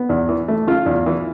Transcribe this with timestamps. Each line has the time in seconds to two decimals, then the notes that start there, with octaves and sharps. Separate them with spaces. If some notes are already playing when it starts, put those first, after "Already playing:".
Already playing: B3
0.09 E2
0.29 E3
0.48 A3
0.67 C#3 F4
0.86 E2
1.06 E3